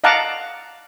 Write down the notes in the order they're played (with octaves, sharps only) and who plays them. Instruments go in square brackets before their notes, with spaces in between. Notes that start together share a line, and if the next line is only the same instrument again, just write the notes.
[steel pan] D#5 F5 F#5 A5 A#5 D6